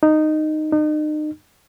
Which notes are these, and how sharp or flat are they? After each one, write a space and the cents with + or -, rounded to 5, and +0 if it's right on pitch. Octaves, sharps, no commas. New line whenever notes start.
D#4 -10
D#4 -35